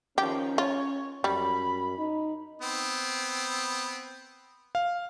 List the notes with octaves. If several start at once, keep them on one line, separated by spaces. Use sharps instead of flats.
D#3 F3 C#4 G4
F4 C#5
F#2 G3 B5
D#4
B3 C4
F5